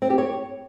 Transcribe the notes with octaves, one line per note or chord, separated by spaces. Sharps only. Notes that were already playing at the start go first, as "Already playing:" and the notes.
C4
G4
C#5